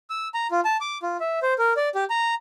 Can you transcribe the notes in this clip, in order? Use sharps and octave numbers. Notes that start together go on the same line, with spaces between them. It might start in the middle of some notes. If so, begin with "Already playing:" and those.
E6
A#5
F4
A5
D6
F4
E5
C5
A#4
D5
G4
A#5